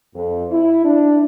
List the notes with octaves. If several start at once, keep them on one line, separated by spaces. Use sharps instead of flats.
F2
E4
D4